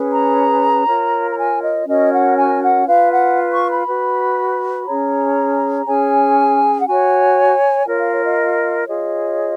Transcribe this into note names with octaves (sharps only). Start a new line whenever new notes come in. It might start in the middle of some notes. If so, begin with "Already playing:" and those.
Already playing: C#4 G#4 B4
A#5
F4 A#4 C#5
A#5
G#5
D#5
C#4 F#4 A#4 C#5 D#5
F#5
G#5
F#5
F4 B4 F5
F#5
C#6
B5
F#4 B4
C#4 G#4 C#5 A#5
C#4 G#4 C#5 G#5
F#5
F#4 C#5 G#5
F4 A#4 C#5
F5
C#5
D#5
F4 G#4 C#5 D#5